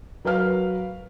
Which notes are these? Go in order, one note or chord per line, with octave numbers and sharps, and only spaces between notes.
F#3 A#4 B4 F5 F6